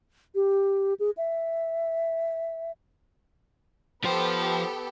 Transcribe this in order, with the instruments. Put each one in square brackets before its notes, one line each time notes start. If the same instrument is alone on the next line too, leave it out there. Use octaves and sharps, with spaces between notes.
[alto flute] G4
G#4
E5
[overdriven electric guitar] F3 C5 [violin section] B3 G4 A4